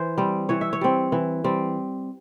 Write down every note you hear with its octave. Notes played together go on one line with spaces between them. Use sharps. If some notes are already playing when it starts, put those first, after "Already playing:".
Already playing: E3 C5
G3 C4
E3 C#5
E5
C#5
G3 C4
E3
G3 C4